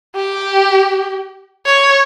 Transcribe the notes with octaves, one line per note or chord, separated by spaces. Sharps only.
G4
C#5